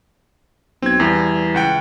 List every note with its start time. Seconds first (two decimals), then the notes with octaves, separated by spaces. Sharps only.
0.82 B1 C4 G#6
1.00 E2 E3 G3
1.54 C#2 F#5 G5